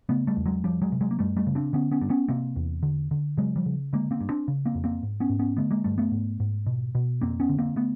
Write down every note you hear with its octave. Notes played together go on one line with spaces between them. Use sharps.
C#3 A3 B3
G3 A3
E2
F#3 G#3
F2 F3 G3
F#3 G#3
C3
F#3 G#3
A#3
F#2 G3 A3
G3 A3
C#3
C4 D4
D3 B3 C#4
B3 C#4
G2
B3 C#4
C3 A#3 C4
E2
D3
D3
C#3 F#3 G#3
F3 G3
C#3
D3 G#3 A#3
A#3 C4
G2
C4 D4
C#3
A#3 C4
F2
A#3 C4
G#2
B3 C#4
G#2
B3 C#4
D3 A3 B3
G#3 A#3
G2 G3 A3
A3 B3
G#2
G#2
B2
B2
F2 A#3 C4
B3 C#4
D3
A#3 C4
A3 B3